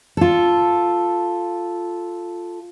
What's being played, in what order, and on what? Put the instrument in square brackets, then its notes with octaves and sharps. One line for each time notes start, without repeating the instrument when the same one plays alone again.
[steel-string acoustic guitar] F4 A4